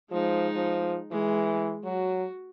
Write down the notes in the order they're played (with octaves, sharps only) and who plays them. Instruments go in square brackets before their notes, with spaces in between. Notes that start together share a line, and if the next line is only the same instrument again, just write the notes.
[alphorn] F3 [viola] G#3 D#4
[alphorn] F3
[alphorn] E3 [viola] G#3
[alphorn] F#3 [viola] F#4